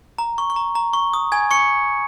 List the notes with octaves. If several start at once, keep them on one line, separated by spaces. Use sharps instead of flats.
A#5
C#6
C#6
A#5
A#5
C#6
D#6
G#5 G#6
C#6 C#7